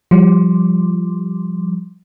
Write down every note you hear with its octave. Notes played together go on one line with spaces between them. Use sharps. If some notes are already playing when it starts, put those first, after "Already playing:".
F3 G3